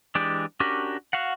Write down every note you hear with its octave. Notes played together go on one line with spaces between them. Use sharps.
E3 G#3 D4 G4 D5
C#4 D4 F#4 G4 A#4
F#4 F5 F#5